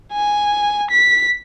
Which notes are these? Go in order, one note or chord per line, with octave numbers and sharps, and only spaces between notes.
G#5
B6